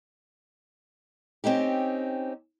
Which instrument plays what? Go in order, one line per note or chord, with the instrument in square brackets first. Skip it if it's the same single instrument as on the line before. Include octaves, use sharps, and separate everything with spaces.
[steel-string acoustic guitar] C4 C#4 D#4 G4